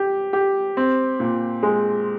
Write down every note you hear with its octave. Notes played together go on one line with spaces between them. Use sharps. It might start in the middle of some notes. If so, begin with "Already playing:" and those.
Already playing: G4
G4
C4
A#2
G#3